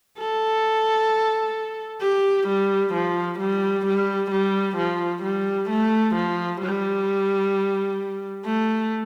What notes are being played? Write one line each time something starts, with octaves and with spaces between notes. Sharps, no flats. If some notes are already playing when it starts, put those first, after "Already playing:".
A4
G4
G3
F3
G3
G3
G3
F3
G3
A3
F3
G3
A3